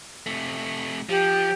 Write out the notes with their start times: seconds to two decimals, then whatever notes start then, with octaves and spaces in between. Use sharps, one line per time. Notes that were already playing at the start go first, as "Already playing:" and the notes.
0.26 C3 A3
1.09 F3 G4